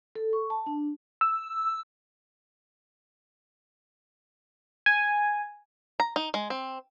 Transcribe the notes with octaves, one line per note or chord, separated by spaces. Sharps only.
A4
C#6
A5
D4
E6
G#5
A#5
D#4
G#3
C4